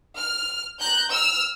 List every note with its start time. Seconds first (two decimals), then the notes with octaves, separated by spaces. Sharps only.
0.17 F6
0.80 A#5 F#6 G6
1.10 E6 F6